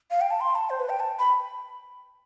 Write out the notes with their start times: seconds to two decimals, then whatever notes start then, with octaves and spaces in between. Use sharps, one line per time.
0.11 F5
0.21 G5
0.31 A5
0.41 C6
0.55 A5
0.70 C5
0.80 B4
0.89 G5
1.00 A5
1.19 B5